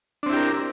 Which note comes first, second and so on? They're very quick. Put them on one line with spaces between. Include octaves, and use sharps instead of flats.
D4 C4 E4 G4 A#4